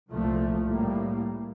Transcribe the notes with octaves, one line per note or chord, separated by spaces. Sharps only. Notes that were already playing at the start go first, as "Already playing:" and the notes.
C2 A#2 F3 A3
A2 G3 A#3